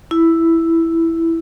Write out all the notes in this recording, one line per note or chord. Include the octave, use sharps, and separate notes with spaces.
E4